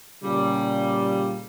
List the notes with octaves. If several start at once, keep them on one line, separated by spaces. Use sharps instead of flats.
A#2 C#3 G3